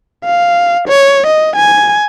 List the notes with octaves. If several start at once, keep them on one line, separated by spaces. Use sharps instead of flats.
F5
C#5
D#5
G#5